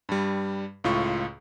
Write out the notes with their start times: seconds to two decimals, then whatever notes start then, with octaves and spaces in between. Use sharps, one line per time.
0.09 G2 G3
0.84 C#2 A2 F4 C#6